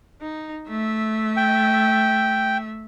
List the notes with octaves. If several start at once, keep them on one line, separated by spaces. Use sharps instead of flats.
D#4
A3 E5
G5